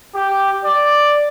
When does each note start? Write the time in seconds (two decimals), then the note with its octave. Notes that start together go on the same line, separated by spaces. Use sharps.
0.15 G4
0.65 D5